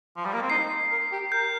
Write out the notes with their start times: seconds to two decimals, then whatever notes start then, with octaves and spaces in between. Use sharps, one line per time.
0.17 F3
0.25 G3
0.33 A#3
0.42 C4
0.50 D#4 C7
0.91 A#4
1.12 G4
1.32 A#4 G6